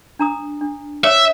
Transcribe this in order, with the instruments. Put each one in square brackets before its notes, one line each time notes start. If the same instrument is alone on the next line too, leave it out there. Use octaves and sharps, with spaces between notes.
[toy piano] D4 A#5 D#6
D4
[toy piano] C5 C#5 [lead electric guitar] E5